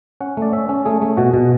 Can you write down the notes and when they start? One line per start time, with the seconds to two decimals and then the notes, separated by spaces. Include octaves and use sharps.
0.21 C#4 F#5
0.37 A3 D5
0.53 C#4 E5
0.69 C#4
0.85 A3 G#4
1.02 A3
1.17 B2 F#4
1.34 B2